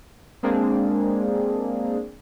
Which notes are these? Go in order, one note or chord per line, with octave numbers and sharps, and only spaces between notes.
G#3 A#3 C4 D4 G#4